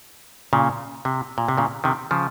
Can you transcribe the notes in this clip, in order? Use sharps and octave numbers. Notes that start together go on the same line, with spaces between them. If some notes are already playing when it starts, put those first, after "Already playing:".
A#2 C#3
C3
A#2
C3
A#2 C#3
C3 D#3
C#3 F3